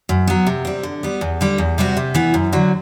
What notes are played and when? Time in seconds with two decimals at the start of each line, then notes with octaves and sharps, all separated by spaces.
0.09 F#2
0.27 F#3 B3
0.47 C3
0.65 G3 C4
0.83 D3
1.03 G3 B3
1.21 E2
1.41 D3 G3
1.58 E2
1.78 C3 G3 C4 F#4
1.97 C3
2.14 E3 B3
2.34 F#2
2.53 D3 F#3